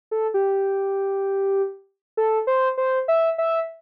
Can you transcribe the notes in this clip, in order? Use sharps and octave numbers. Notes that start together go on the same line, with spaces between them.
A4
G4
A4
C5
C5
E5
E5